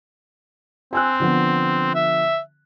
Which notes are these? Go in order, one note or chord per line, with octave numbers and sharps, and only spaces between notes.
C4 G#5 E6 F#6
D3 F3 B3
E5